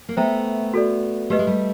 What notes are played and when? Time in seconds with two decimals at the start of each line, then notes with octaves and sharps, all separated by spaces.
0.09 A#3
0.17 A3 B3 C5 E5 G5 A#5
0.74 F#4 A4 D5
1.30 A3 G4 B4 D#5
1.39 G#3
1.47 G3 A3